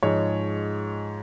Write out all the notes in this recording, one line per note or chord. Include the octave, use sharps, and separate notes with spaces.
G#2 F3 G#3 C#5